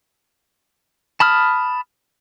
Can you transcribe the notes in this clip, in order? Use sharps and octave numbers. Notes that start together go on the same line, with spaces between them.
A5 B5 D#6 F6